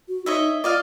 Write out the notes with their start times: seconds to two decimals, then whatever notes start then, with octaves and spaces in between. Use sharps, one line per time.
0.08 F#4
0.26 D#4 C#5 D#5 E5
0.64 F4 D5 D#5 F5